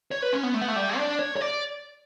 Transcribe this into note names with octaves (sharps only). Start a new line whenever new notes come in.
C#5
B4
C#4
B3
A3
B3
A3
G3
D4
C#5
C#5
D5